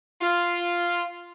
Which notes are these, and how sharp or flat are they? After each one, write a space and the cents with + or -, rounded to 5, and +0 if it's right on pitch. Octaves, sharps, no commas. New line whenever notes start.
F4 -5